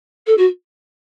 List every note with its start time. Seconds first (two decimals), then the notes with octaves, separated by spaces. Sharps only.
0.26 A4
0.37 F#4